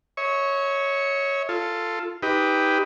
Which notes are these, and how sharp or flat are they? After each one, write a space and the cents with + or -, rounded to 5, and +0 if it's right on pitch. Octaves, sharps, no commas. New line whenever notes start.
C#5 +0 E5 -45 C#6 +0
F4 -5 A4 +5
D#4 +20 G4 +10 B4 +5